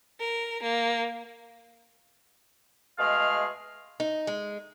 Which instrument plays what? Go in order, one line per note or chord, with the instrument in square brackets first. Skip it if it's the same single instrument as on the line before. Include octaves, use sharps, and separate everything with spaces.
[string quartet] A#4
A#3
[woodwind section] B2 G#3 A3 G#4 F5 F6
[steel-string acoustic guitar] D#4
G#3